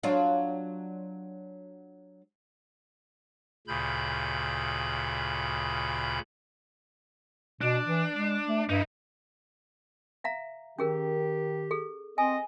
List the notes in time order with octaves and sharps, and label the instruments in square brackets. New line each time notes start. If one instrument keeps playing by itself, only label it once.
[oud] F#3 D4 F4
[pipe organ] D2 A#2 C#3 B5 G6
[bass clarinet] B2 [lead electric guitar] D4
[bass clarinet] E3
G#3
A3
[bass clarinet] G2 [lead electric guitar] D#4 E4
[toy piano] E5 F5 A#5
[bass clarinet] D#3 [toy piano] C#4 G#4 A#4 [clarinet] G4
[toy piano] G#4 A4
[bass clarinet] C4 [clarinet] D#5 [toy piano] G#5